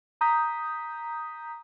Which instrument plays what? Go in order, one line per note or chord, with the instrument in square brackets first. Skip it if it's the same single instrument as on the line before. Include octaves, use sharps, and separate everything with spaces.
[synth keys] A#5 D#6 G6 B6